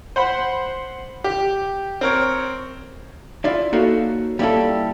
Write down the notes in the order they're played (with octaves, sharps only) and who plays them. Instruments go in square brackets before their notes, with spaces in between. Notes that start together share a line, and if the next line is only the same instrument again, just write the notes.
[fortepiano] C5 F#5 B5
G4
C4 A#4 C#5
[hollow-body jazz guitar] E4 F4 D5 E5
A#3 D#4 F#4 A4 C#5 F5
G3 A#3 C#4 E4 G4 A4